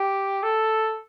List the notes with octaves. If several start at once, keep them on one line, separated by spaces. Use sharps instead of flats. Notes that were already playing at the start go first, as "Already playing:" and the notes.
Already playing: G4
A4